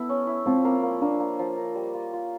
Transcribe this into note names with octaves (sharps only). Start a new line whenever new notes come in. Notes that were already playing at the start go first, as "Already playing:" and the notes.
Already playing: B3 E4 A4
C#4
E4
F3 C4
A#3
A#3
A#3 D4
A#3
F3
A#4
G3
F4
F4